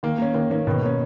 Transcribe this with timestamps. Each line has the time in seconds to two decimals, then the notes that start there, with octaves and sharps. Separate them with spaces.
0.03 D#3 A#3
0.18 A#3 C#4
0.34 D#3 A#3
0.50 D#3 A#3 C#4
0.67 B2 D#3
0.82 A#3 C#4